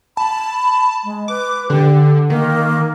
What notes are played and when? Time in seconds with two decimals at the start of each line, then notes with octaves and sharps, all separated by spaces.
0.17 A5 B5
1.04 G#3
1.28 B4 D6
1.70 D3 G4
2.30 D#3 A#3